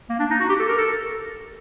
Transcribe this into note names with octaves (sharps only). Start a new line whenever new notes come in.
A#3
D4
D#4
F#4
G4
A4
A#4
A4